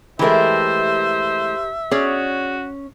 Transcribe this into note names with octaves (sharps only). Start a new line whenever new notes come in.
E3 G#3 A3 G4 A#4 C5 E5
C#4 F#4 G#4 C#5 D5